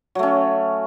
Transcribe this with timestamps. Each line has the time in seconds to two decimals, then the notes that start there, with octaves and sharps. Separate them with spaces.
0.15 F#3
0.19 A3
0.23 C#4